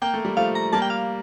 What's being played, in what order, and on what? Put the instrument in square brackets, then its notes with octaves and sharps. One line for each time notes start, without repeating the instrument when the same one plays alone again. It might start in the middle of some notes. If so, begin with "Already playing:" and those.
[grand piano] A#3 [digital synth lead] G5
[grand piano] A3
G3
[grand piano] F3 A3 [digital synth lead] F5
[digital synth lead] A#5
[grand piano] G3 A#3 [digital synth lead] A5
[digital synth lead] G5
F5